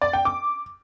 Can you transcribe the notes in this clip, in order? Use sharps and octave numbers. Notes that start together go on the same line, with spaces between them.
D5
G5
D6